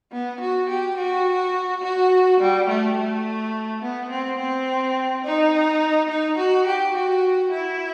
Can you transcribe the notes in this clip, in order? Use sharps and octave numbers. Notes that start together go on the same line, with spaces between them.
B3
F#4
G4
F#4
F#4
G3
A3
A3
B3
C4
C4
D#4
D#4
F#4
G4
F#4
E4